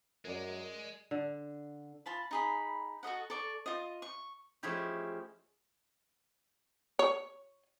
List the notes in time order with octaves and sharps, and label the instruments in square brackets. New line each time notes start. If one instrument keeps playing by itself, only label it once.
[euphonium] F#2 [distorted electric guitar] G#3 [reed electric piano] A#4 D5
[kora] D3
[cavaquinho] F4 A5 B5
D#4 G#4 B5
F#4 A4 D#5 F#5
A4 D5 C#6
F4 D#5
C#6
[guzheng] F3 G#3 A3 C#4 E4 G4
[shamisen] C#5